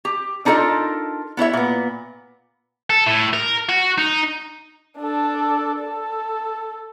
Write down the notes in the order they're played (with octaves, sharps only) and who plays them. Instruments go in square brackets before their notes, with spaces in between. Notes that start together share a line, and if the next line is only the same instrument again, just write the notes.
[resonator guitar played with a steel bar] G4
D4 D#4 F4 A4 A#4 D#5
B3 E4 C#5 E5
A#2 B3
[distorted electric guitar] A4
A2
A#4
F#4
D#4
[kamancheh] D4 A4
A4